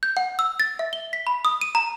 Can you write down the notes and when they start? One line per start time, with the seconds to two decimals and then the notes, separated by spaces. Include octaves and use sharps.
0.03 G6
0.17 F#5
0.39 E6
0.60 A6
0.79 E5
0.93 G7
1.13 B6
1.27 B5
1.45 D#6
1.61 D#7
1.75 A#5